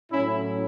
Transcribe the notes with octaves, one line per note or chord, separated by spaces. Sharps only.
A2 F#3 C#4 E4